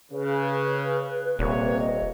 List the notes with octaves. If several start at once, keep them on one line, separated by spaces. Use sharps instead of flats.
C#3 B4
D#1 C3 A#3 C#5
D#5